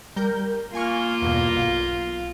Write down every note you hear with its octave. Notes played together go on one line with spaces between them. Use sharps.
G3 A#4 G6
A#3 F4 G#5 C#6 F6
E2 G2 B2
B1